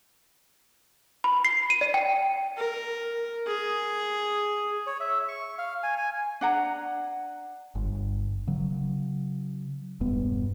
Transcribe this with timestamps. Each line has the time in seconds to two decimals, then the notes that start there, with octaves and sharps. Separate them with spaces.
1.24 B5
1.45 C7
1.70 D#7
1.81 D5
1.94 G5
2.58 A#4
3.48 G#4
4.87 C#5
5.00 E5
5.28 C#6
5.58 F5
5.83 G#5
5.98 G#5
6.41 D4 F#5 A#5
7.75 G1
8.47 C#3 F#3
10.01 E1 G2 B3